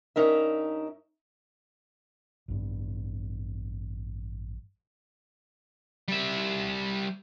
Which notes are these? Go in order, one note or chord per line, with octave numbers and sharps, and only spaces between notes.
G2 C#4 D#4 A#4 E5
A1 G2
G3 E5